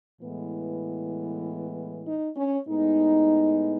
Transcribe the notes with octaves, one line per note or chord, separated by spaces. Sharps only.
A2 E3 G#3 B3
D#4
C#4
A2 G#3 B3 D#4